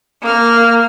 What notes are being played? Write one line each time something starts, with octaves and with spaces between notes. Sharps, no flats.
A#3 F6